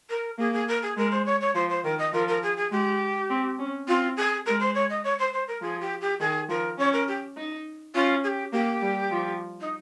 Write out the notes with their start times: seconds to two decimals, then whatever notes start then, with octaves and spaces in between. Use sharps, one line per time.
0.10 A#4
0.38 A#3 G#4
0.53 G#4
0.68 A#4
0.82 G#4
0.97 G#3 A#4
1.11 C5
1.26 C#5
1.41 C#5
1.55 F3 C5
1.70 C5
1.84 D#3 A#4
1.99 D#5
2.13 F3 A#4
2.28 A#4
2.43 G#4
2.57 G#4
2.71 G#3 G4
3.30 C4
3.59 C#4
3.88 C4 F4
4.17 G#4
4.46 G#3 A#4
4.60 C5
4.75 C#5
4.90 D#5
5.04 C#5
5.19 C5
5.33 C5
5.48 A#4
5.62 F3 G#4
5.81 G4
6.01 G4
6.20 D#3 G#4
6.49 F3 A#4
6.78 C#4 C#5
6.93 A#4
7.08 G4
7.37 D#4
7.95 C#4 F4
8.24 G#4
8.28 G4
8.52 A#3 G4
8.82 G3
9.11 F3
9.61 D#4